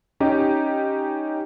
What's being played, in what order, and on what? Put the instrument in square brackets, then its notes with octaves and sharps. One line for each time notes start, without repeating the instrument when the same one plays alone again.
[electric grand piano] C#4 D#4 G4